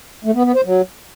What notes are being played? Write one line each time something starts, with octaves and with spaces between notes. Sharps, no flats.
A3
B3
B3
C5
F#3